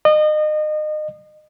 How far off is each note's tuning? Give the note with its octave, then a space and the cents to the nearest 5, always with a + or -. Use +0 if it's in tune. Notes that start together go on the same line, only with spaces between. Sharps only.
D#5 -30